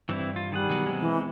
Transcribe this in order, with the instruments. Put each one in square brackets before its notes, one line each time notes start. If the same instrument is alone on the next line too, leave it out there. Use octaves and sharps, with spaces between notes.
[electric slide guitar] G2 [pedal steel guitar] E3 C4 E4
[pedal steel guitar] F4
[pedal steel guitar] D#3 G#4 F#5 [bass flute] G3
[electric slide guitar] B2 F#3 B3
[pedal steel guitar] G#3 C4
[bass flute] E3